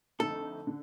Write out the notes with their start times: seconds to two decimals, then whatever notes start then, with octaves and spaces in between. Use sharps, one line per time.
0.19 F2 D3 A3 D#4 A4
0.67 D3